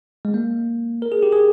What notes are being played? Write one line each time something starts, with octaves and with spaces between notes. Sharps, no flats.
G#3
A#3
A#4
G#4
G4
G#4